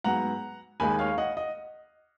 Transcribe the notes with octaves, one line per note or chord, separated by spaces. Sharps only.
G#2 F#3 B3 F#5 A#5
D#2 D#3 G#3 G#5 B5
C#5 F5
D#5 F#5
D#5